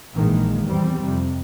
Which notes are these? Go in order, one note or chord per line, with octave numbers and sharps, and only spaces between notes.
A#1 A#2 D#3 E3 G#3 A#3
E2 G3 C4
F2 C3